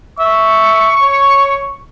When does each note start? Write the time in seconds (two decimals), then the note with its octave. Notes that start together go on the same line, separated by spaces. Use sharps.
0.19 E5 C#6
1.02 C#5